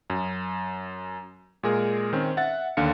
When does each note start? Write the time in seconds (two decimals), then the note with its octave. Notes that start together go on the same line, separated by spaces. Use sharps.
0.10 F#2
1.63 A#2 G#3 G#4 A#4
2.13 D#3 C4 C#4
2.37 E5 F#5 A6
2.77 D#2 D3 D4 F5 C#7